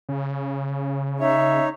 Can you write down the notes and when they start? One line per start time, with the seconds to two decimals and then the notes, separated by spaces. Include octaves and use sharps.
0.09 C#3
1.20 D#4 C#5 E5